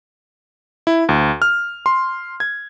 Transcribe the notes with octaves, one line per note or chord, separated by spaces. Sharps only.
E4
D2
F6
C6
G#6